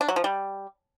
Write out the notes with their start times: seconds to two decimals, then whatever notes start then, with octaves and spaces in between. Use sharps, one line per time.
0.01 D4
0.08 F#3
0.16 F3
0.24 G3